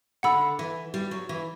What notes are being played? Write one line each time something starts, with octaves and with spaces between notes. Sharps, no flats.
D3 F#5 B5 E6
E3
G3
F#3
E3